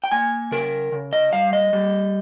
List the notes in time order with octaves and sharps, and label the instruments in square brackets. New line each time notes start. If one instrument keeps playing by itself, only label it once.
[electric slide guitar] G5
A#3 G#5
C#3 A#4
C#3
D#5
G3 F5
D#5
G3